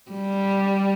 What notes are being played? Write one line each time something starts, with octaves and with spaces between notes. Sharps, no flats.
G3